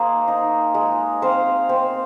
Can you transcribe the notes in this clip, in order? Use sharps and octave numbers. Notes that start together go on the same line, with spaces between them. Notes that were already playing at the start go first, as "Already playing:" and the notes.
Already playing: A#3 D#4 G#4 A#4 C5
D#4
G#3
C4 C5 F5
C4